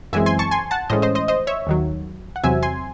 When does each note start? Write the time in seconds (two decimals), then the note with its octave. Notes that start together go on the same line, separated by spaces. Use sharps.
0.13 F#2 E3 G#3 C4 E5 G#5
0.26 G#5 C6
0.39 A5 C#6
0.51 G#5 C6
0.71 F#5 A5
0.90 A2 E3 G#3 C#4 C5 D#5
1.02 C5 D#5
1.15 C5 D#5
1.28 C5 D#5
1.47 C#5 E5
1.67 D#2 D#3 F#3
2.36 F#5
2.44 E2 C3 F#3 C4 E5 G#5
2.63 G#5 C6